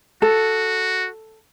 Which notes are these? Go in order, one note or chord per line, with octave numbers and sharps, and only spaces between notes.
F#4 A4